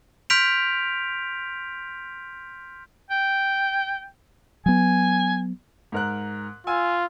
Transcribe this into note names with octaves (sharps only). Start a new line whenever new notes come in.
C6 F6 G6 B6 D7 F7
G5
F#3 B3 G#5
G#2 A#4 F#6
F4 G#5 E6